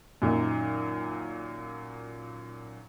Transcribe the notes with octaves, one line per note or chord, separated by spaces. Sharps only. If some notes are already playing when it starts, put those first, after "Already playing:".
F#2 A#2 D#3 A#3